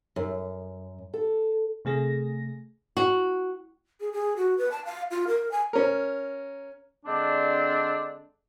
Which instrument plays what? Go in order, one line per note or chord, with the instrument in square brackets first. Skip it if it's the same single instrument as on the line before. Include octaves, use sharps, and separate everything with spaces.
[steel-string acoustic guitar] F#2
A4
[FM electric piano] C3 A3 G#4 A#6
[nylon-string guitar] F#4
[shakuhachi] G#4
G#4
F#4
B4
A5
F5
F4
A#4
G#5
[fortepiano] C#4 A#4
[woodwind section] D3 G#3 C4 D4